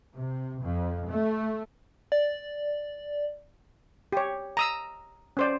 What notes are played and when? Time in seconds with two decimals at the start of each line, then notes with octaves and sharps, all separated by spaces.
0.16 C3
0.62 F2
1.07 A3
2.12 D5
4.12 G4 C#5
4.57 A#5 D#6 E6
5.37 C#4 C5 D5